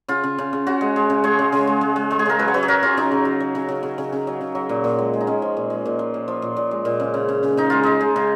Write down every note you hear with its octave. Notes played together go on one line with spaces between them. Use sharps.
C#3 F4
C#3
C#3
C#3
C#3 F#4
G#3
G#3
C#3
G#3 C#5
C#3
C#3
G#3
G#3
G#3
G#3
G#4
C#3 A#4
F#3 B4
C#5
F#3 B4
G#4
F#3 A#4
C#3 F4
C#3 D#4
C#3
F#3
F#3
C#3
C#3
C#3
C#3
C#3
F#3
C#3
F#3
A#2
A#2
G#3
G#3
D#4
G#3 C#4
F3
A#2
G#3
A#2
F3
A#2
F3
A#2
A#2
G#3
A#2
C#3
C#3
C#3
C#3
C#3 D#4
G#3 F4
G#3 D#4
G#3
C#3